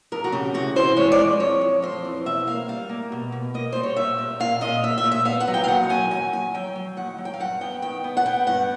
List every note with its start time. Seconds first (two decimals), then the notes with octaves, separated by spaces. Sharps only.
0.12 F2 A#4
0.24 F#4
0.32 C#3 G4
0.54 C3 F#4
0.76 E3 C5
0.97 G#3 C#5
1.12 D5
1.19 F2
1.40 F2 C#5
1.61 F2
1.82 F2 C5
2.05 E3
2.26 B2 E5
2.47 A#3 F5
2.68 G3 F5
2.89 A#3
3.12 B2
3.32 B2
3.54 A#3 D#5
3.72 G3 C5
3.83 C#5
3.96 A#2 E5
4.18 A#2
4.40 A#2 F5
4.61 A#2 D#5
4.83 A#2 E5
4.98 E5
5.04 A#2
5.12 E5
5.25 B3 F5
5.40 F#5
5.47 F#3
5.54 G5
5.64 F5
5.68 D#2 F#5
5.89 D#2 G#5
6.11 F#3 G#5
6.33 D#2 G#5
6.54 F#3 G5
6.76 F#3
6.97 D#2 F#5
7.18 F#3
7.25 G5
7.34 F5
7.40 G2 F#5
7.61 B3 G5
7.82 D#3 G5
8.04 B3
8.17 F#5
8.25 B3 G5
8.47 G2 F#5